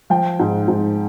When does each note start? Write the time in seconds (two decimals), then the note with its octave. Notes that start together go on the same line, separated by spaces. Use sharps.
0.10 F3 G5
0.39 G#2
0.68 G#2